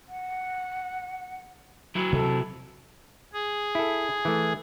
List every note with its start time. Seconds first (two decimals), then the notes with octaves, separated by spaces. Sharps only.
0.09 F#5
1.95 F#3 E4
2.13 C3 A4
3.33 G#4
3.75 E4 A4
4.25 E3 A3